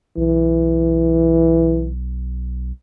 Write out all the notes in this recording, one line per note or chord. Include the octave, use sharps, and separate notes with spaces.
B1 E3